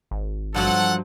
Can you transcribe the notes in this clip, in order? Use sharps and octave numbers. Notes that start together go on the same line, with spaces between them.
G#1
G2 F3 F#3 A4 F#5